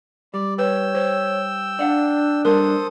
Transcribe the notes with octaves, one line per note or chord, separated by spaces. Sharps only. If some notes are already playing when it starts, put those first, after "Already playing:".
G3 D5
B4 C#5 G5 E6
C5
D4 D5 F5 F#5
G3 A#3 A4 A#4 C5 D#6